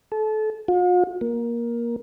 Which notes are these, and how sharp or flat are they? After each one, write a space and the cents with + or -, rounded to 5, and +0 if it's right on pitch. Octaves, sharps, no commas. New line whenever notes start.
A4 -30
F4 +45
A#3 +15